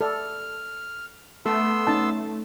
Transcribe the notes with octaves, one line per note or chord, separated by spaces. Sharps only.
A4 D5 F6
A3 B3 A4 C6 E6
C#4 D#4 A5